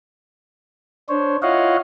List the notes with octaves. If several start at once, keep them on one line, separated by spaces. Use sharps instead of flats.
D4 C5 C#5
E4 F4 C#5 D#5 F5 F#5